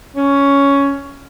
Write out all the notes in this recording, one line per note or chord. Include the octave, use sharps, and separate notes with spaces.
C#4